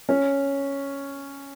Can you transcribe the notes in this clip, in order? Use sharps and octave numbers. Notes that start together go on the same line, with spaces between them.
C#4